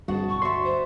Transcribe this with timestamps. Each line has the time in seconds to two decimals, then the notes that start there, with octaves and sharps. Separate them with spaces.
0.08 G1 G2 C4 F#4 G#4 D#5 A5
0.28 B1 A2 C#6
0.42 G1 D2 F#4 D5 E5 C6 C#6
0.64 C5